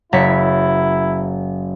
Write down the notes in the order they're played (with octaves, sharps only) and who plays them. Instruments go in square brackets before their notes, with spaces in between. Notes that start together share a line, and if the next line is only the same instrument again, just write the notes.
[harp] F#1 C#5 B6 [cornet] E4